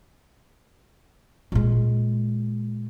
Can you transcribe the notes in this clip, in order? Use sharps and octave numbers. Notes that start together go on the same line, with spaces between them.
A#2 G#3